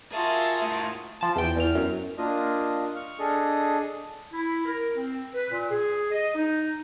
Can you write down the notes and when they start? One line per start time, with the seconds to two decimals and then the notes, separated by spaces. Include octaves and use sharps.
0.12 F4 F#4 G#4 A#4 E5 A5
0.62 A2 G#4
1.21 F3 A5
1.36 E2 G5
1.56 E2 F6
1.75 F#2
2.18 A#3 D4 F4 D#5
2.96 C#6 F6
3.19 D4 G#4 A4 D#5
4.33 E4
4.66 A#4
4.96 C4
5.34 B4
5.51 A#2
5.71 G#4
6.12 D#5
6.35 D#4